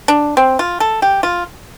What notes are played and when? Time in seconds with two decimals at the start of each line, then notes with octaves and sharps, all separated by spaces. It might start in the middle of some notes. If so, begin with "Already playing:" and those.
0.08 D4
0.37 C4
0.59 F4
0.80 A4
1.02 G4
1.23 F4